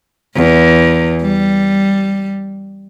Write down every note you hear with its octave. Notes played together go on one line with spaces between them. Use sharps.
E2
G3